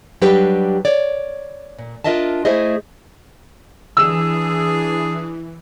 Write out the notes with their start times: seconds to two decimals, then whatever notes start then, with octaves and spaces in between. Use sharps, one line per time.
0.22 F#3 G3 D4 G4 B4
0.85 C#5 D5
1.78 A#2
2.04 D4 F4 A#4 D#5 E5 A5
2.45 A3 E4 G#4 C5 D#5
3.97 E3 D4 G#4 E6